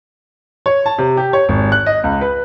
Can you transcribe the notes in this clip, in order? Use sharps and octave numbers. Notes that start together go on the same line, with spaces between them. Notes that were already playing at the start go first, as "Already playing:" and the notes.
C#5
A5
C3
G4
C#5
G#1
F#6
D#5
C#2
B4